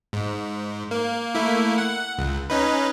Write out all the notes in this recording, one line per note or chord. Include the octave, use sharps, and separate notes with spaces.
G#2
A#3
A3 A#3 E4
F#5
C#2
C#4 D#4 B4